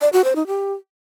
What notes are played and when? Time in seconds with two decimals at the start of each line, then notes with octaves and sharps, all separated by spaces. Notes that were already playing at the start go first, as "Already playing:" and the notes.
0.01 D5
0.13 F#4
0.24 C5
0.36 D#4
0.47 G4